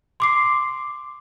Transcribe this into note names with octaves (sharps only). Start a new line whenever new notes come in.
C6 D6 C7